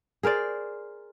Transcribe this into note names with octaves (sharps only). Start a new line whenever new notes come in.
G#4 A#4 C5 D5